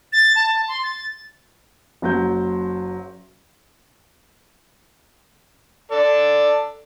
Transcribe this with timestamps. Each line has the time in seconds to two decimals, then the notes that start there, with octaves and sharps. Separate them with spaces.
0.13 A6
0.36 A5
0.68 C6
0.83 A6
2.02 F#1 F#3 G6
5.92 A4 D5